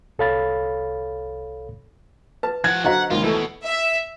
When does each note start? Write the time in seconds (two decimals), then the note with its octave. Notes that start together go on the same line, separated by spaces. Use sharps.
0.19 C2 A4 C#5 F5 B5 A6
2.43 B4 A5
2.64 F3 F#5 G#6
2.84 D3 F#3 F#4 C5 D#5 F5 F#5 A#5
3.10 C#2 D#3 A#3 F4
3.23 B2 E3 A3 A4
3.65 E5